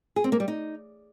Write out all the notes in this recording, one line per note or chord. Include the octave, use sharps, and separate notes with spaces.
G#4
C4
A#3
G3
D#4